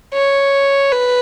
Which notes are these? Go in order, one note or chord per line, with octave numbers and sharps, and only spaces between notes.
C#5
B4